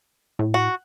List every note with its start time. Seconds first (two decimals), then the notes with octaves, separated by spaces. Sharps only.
0.39 A2
0.54 F#4